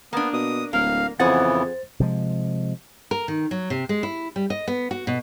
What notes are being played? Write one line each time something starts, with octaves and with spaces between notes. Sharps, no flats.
A#3 B3 D4
B2 D#6
D1 A#3 F5
F2 C#3 E3 B3 G#4 C5 F#5 A6
C3 F3 G#3
A#4
D#3
F#3
C3
G#3
E4
G3
D#5
B3
F#4
B2